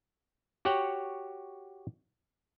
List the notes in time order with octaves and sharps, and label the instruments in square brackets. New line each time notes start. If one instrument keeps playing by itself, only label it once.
[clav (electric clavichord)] F#4 G4 C#5 F#5 G5